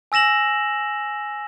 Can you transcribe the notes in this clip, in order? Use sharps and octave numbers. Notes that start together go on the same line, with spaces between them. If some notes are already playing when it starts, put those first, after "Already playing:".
G#5 E6 A#6 E7 F#7